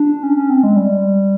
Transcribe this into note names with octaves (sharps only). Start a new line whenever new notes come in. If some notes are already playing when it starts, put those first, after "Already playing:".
Already playing: D4
C#4
C#4
C4
G#3
G3